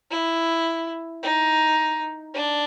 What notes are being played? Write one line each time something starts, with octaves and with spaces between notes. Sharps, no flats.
E4
D#4
D4